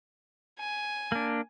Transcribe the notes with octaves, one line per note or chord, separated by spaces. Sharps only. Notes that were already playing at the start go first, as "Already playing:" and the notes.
G#5
A#3 D4